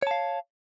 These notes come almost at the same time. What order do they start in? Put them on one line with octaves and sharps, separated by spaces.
C#5 A5 F5